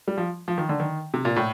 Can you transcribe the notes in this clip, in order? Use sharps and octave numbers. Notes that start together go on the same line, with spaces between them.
G3
F3
F3
D#3
D3
D#3
C3
A#2
A2